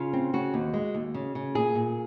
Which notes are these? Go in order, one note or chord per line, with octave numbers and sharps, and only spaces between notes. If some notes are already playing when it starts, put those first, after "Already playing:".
Already playing: C#3 F4
C4
C#3 F#4
D#2
G#3
D#2
C#3
C#3
A#2 G#4
A#2